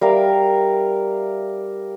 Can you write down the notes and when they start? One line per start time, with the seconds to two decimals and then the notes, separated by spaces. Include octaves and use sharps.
0.01 G3 A#4 E5 F5